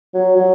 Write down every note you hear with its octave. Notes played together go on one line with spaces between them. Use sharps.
F#3
F#3